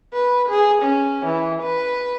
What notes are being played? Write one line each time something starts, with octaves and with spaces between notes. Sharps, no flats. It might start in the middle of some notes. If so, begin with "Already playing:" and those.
B4
G#4
C#4
E3
B4